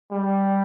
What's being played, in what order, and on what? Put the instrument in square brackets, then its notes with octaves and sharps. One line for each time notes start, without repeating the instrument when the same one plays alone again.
[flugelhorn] G3